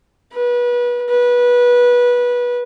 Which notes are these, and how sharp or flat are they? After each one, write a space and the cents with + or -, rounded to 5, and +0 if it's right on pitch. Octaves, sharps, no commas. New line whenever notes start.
B4 -30
B4 -20